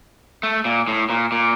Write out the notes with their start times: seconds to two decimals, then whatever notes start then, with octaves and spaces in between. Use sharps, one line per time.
0.43 A3
0.65 A#2
0.88 A2
1.10 A#2
1.32 A#2